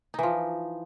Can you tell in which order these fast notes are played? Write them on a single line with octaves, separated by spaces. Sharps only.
D#4 E3 F3